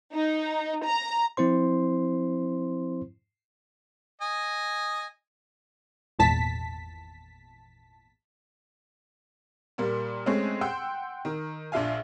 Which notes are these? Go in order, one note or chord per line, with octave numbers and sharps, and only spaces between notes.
D#4
A#5
F3 C4 E4 C5 C6
D#5 G#5
G#1 E2 A#2 A5 B6
A#2 G3 A#3
G#3 A3 C4 C#4
F#5 G5 C6 E6
D#3
A#1 D4 F4 E5 F5 G#5